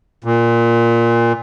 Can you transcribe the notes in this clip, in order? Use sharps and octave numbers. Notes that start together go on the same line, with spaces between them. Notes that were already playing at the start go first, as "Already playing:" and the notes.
A#2